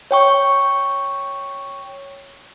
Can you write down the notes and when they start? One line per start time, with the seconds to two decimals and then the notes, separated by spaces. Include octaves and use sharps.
0.11 C#5 G5 C#6